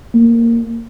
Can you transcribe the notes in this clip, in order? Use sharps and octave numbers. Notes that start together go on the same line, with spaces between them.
A#3